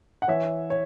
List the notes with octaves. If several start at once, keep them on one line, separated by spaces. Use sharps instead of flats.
F#5
E3 C#5 E5
C#5